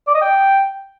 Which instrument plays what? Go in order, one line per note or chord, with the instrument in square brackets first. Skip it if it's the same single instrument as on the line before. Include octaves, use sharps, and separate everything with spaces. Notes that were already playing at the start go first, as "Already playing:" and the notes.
[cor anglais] D5
D#5
G5